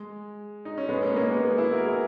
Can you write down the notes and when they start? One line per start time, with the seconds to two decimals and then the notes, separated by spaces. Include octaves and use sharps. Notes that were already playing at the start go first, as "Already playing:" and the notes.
Already playing: G#3
0.65 D#4
0.77 C#4
0.89 G#3 B3
1.03 A#3 C#4
1.12 D#4
1.16 A#3 C#4
1.31 G#3 B3
1.44 G#3 B3
1.58 E4 G#4
1.72 F#4 A#4
1.86 E4 G#4